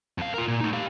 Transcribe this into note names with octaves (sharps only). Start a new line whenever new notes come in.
F2 F5
F4 A#4
A#2
A3 D#4
G4 F5